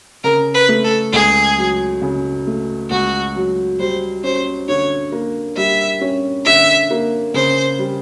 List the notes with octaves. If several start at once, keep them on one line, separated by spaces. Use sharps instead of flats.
C#3 A#4
B4
A3
A4
C#2 G#4
F#3
C#3
A3
C#2 F#4
F#3
G3 C5
C#4 C5
D3 C#5
A#3
G3 E5
C#4
D3 E5
A#3
C#3 C5
G3